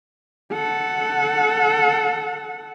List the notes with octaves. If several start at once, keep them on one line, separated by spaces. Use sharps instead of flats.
A4 F#5